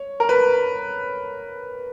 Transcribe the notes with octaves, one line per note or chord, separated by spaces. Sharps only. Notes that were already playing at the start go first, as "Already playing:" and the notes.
Already playing: C#5
A#4
B4